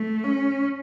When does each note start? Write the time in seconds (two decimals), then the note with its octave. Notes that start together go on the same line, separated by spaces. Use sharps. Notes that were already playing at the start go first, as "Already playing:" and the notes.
Already playing: A3
0.23 C#4